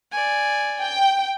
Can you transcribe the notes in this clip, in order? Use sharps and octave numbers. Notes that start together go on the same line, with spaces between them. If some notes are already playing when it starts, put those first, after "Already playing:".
D5 G#5
G5